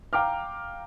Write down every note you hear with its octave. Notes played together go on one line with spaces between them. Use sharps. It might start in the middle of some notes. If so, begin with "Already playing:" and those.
F5 G5 A#5 D6 F6